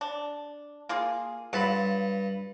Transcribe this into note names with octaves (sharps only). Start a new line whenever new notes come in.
D4
A#3 F4 G#4
G2 F#3 F4 A5 B5